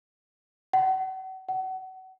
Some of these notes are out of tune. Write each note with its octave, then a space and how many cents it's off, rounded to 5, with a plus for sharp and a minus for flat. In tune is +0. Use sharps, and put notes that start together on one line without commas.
F#5 +40
F#5 +30